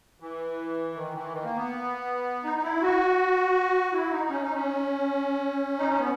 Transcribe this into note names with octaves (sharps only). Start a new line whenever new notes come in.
E3
D#3
E3
D#3
A#3
B3
D#4
D#4
E4
F#4
E4
D#4
C#4
D#4
C#4
D#4
C#4
B3